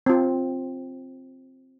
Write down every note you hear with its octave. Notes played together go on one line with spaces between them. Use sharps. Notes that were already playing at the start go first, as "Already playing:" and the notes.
C4 F4